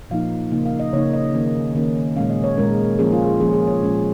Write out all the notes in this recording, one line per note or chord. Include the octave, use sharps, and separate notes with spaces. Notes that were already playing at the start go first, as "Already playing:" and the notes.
A#2 F3 A#3 D#4 F5
C#3 A#3 D#4 D#5
F5
D#5
C#3 A#3 D#4 C#5
D#5
D#3 A#3 C#4
D#3 A#3 C#4
A#2 G#3 C#4 F5
D#5
C#5
A#2 G#3 C#4 A#4
F3 A#3 C#4 G#4
F4
G#4
F3 A#3 C#4 G#4
G#4
C#5
A#2 G#3 C#4